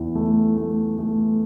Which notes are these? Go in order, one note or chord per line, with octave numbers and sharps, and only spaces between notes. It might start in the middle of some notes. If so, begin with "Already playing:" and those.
Already playing: E2 E4
A3
A3
A3